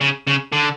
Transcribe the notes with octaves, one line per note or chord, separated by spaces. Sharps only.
C#3
C#3
D3